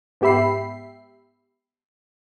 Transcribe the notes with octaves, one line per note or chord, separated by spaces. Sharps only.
G#2 B3 G4 E5 B5 C7